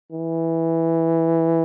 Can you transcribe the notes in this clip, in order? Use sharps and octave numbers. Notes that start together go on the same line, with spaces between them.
E3